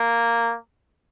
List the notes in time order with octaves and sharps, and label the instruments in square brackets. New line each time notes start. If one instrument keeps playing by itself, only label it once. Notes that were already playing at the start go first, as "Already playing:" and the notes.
Already playing: [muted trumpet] A#3